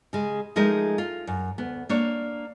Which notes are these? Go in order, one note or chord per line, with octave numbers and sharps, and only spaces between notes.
C#3 G#3
F3 G#3 A3 D#4 A#4
F4
F#2
D2 B3
A#3 D4 C#5